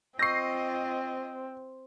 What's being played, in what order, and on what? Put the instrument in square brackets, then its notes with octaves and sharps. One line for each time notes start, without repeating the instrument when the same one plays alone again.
[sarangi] C4 [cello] F4 D#5 [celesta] C#6 E6 G6 [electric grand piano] A#6 C7